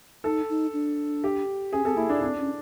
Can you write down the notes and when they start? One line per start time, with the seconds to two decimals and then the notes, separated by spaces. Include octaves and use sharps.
0.24 D#4 A4
0.50 D#4
0.73 D4
1.24 G4
1.73 C#4 G#4
1.85 C4 A4
1.97 A#3 E4
2.09 D4
2.21 C4 D4
2.38 C#4